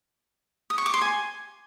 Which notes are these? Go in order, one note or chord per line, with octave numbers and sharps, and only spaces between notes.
D#6
C#6
D6
C6
G#5